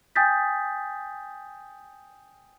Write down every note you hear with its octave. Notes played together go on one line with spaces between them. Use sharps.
G5 G#5 D#6 G6 A6 B6